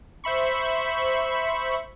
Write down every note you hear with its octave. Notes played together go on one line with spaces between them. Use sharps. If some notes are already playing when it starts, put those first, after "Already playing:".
C5 E5 B5 C#6